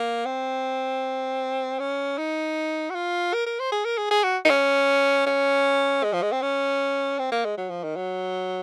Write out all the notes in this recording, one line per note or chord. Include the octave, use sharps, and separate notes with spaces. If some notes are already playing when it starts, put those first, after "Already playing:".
Already playing: A#3
C4
C#4
D#4
F#4
F4
A#4
A#4
C5
G#4
A#4
G#4
G#4
F#4
D#4
C#4
C#4
G#3
F3
G#3
C4
C#4
C4
A#3
G#3
F#3
F3
D#3
F#3